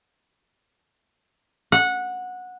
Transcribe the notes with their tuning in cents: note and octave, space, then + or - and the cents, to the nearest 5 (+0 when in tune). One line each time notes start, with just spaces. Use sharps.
F#5 -15